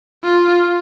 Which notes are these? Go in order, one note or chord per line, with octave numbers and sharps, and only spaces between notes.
F4